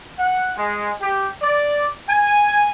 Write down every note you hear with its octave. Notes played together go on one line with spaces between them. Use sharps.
F#5
G#3
G4
D5
G#5